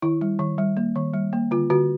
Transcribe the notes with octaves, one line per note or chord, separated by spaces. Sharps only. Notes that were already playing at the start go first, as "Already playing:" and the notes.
D#3 E4
G3
D#3
G3
A#3
D#3
G3
A#3
D3 F4
D3 F#4